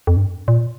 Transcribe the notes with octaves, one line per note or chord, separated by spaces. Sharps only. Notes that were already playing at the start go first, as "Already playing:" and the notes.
F2
G2
A#2